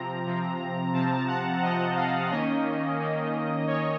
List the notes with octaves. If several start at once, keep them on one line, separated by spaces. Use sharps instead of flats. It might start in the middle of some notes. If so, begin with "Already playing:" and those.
Already playing: C3 F3 C4 A#5
C3 F3 C4
C3 F3 C4 A5
F#5
C3 F3 C4 D#5
F5
D#3 A#3 C#4 D#5
D#3 A#3 C#4
D#3 A#3 C#4 C#5